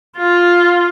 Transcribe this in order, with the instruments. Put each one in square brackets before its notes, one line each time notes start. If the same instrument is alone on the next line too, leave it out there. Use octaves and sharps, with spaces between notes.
[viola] F4